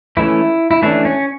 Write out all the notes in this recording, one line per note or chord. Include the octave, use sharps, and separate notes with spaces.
E3 A3 C#4 E4
E4
E3 A3 C#4 D4
C#4